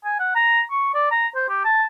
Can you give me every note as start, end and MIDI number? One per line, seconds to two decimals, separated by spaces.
0.05 0.15 80
0.19 0.33 78
0.36 0.61 82
0.71 0.92 85
0.95 1.10 74
1.11 1.27 82
1.35 1.46 72
1.49 1.63 67
1.65 1.84 81